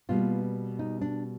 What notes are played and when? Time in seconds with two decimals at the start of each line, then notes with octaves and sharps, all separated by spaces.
0.09 B2 G3 A#3 F4
0.79 D#4
1.01 D4